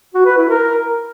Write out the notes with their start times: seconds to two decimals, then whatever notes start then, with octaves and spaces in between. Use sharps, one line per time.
0.14 F#4
0.26 B4
0.37 E4
0.49 A#4